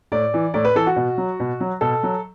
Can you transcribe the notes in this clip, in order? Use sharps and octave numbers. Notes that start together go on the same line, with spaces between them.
A2 D5
E3
A2 D5
B4
E3 A4
F#4
B2
F#3
B2
F#3
B2 A4
F#3